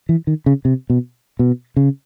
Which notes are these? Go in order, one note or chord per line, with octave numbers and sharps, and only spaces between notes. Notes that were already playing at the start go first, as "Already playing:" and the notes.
E3
D#3
C#3
C3
B2
B2
C#3